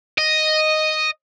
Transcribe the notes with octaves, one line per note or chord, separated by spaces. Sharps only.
D#5